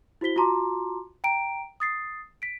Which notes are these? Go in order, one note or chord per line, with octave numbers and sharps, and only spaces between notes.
E4 F#4 C5 B6 G7
F4 F#4 A5 A#5 C6 D6
G5 A#5 D7
D#6 A6 C7
B6 D7